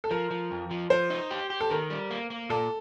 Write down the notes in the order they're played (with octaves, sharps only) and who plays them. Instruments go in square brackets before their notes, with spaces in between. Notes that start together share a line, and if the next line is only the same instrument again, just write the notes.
[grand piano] A4
[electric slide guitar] F3 [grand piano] A#4
[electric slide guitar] F3
F2
F3
[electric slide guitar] F3 [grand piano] C5
[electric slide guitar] D#4
G4
G4
[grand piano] A4
[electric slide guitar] D#3 [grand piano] A#4
[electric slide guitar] G3
A#3
A#3
[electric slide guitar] A#2 [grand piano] A4